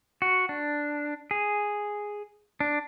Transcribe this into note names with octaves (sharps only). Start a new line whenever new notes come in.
F#4
D4
G#4
D4